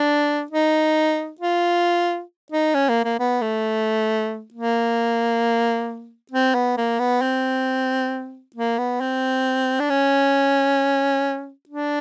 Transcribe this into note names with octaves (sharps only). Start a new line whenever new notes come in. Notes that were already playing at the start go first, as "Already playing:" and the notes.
Already playing: D4
D#4
F4
D#4
C#4
A#3
A#3
B3
A3
A#3
C4
B3
A#3
B3
C4
A#3
B3
C4
D4
C#4
D4